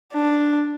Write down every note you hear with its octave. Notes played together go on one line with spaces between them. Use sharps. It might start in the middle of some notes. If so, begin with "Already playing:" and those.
D4